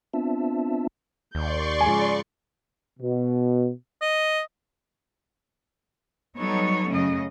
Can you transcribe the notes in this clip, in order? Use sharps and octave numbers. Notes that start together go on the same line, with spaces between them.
B3 C4 D4 F4 E5 A5
D#2 D5 C6 C#6 G6
G#2 C#3 F3 G#5
B2
D#5
F#3 G3 B3 D#4 A4 C#5
F#2 C#3 A3 C#4 D#5